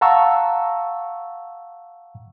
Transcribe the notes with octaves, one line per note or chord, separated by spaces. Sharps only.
F5 F#5 A5 A#5 C#6 E6